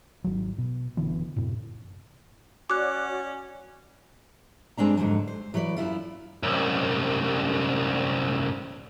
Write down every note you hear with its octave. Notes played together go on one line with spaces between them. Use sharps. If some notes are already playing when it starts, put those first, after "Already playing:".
G#1 F#3
B2
F#1 D3 E3 B3
F#2 A2 C3
C#4 F#4 C#5 D5 D6 F#6
G2 G#3 C4 D4 A#5
F2 G#2 D3 E3 F#3
C5
E3 F#3 B4 C#5 D5
F#2 B2 E4 F4
C2 F#2